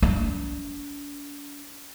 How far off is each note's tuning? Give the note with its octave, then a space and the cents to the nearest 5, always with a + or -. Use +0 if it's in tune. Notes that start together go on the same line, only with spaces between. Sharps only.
D4 -40